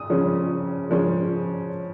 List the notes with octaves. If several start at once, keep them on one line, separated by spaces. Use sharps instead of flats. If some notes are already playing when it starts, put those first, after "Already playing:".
Already playing: D#6
C#3 F3 G#3 C#4
C#3 F3 G#3 C#4